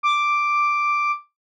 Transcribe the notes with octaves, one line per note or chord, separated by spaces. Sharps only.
D6